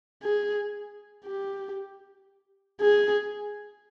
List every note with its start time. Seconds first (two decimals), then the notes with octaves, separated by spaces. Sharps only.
0.23 G#4
1.25 G4
2.81 G#4